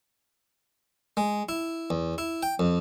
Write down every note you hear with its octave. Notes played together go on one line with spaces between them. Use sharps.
G#3
E4
E2
E4
G5
F2